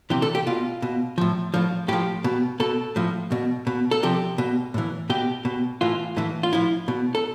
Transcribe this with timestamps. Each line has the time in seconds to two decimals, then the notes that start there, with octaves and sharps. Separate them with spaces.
0.10 C3 E3 G4
0.22 A4
0.35 G4
0.47 B2 F4
0.82 B2
1.18 A2 F3
1.54 A2 F3
1.88 A2 F3 G4
2.24 B2
2.60 B2 A4
2.96 A2 F3
3.32 B2
3.67 B2
3.91 A4
4.03 C3 F3 G4
4.38 B2
4.74 A2 E3
5.10 B2 G4
5.45 B2
5.81 A2 E3 F4
6.17 A2 E3
6.43 F4
6.52 A2 F3 E4
6.88 B2
7.15 A4